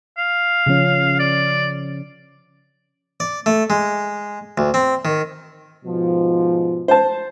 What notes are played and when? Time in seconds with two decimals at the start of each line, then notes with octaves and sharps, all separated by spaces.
0.18 F5
0.66 C#3 F3 C#4
1.19 D5
3.20 D5
3.46 A3
3.70 G#3
4.58 D2
4.74 C4
5.05 D#3
5.85 G#2 B2 F3
6.88 C5 A5